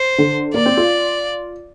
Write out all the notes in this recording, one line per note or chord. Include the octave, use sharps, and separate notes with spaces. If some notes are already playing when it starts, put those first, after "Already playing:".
Already playing: C5
D3
A#3 D5
C4
F4